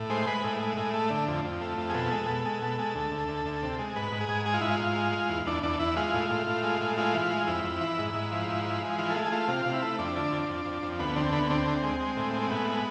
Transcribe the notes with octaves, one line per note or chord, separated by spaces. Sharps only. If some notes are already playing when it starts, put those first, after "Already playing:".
Already playing: A2
G#3 C5
G#3 B4
A2
G#3
A2
A3
D3
F2
F2
A3
F2
G#4
B2 A4
G#3
B2
G#3
B2
G#3
D2
D2
D2
D2
C3
G#3
G#2 B4
G#2
G#4
G#2
G#3 G#4
F4
G#2 E4
F4
G#2
G#3
G#3
E2
E2 D4
E2 D4
E2 E4
G#3 F4
A2
A2
A2
G#3
A2
G#3 F4
E3
G#3
F2 E4
F2
E3
G#2
G#2
F3
G#2
F3
G#3
E3 F4
A4
A3 G#4
G#4
A3 F4
C3 F4
C3
E4
A3
F2 D4
D3
F2
F2
F2
F2
D2 B3
D3 C4
D2 B3
D3 C4
D2
G#3
G#3
A2
G#3
C4
A2 B3
G#3